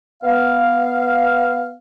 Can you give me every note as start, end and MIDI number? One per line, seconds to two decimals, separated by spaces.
0.23 1.74 59
0.23 1.74 77